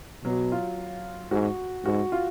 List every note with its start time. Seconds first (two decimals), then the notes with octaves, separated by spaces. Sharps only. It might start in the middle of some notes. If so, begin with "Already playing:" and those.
0.24 B2 F#3
0.52 F4
1.31 G#2 F#4
1.85 G#2 F#4
2.12 F4